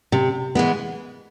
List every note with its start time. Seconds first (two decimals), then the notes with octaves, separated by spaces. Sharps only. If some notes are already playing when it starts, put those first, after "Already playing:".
0.12 C3
0.55 E3 G#3 B3